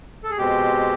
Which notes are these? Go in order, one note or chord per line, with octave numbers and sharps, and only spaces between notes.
A4
G#4
B2 G#3 C4 G4